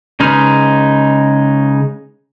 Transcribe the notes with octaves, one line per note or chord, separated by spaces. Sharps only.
C#3 G#3 D#4 B4 F6